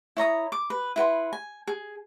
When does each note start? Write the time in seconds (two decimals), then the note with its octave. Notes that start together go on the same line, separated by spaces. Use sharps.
0.17 E4 C#5 A#5 D#6
0.52 D6
0.70 B4
0.96 E4 B4 F#5 C6
1.33 G#5
1.67 G#4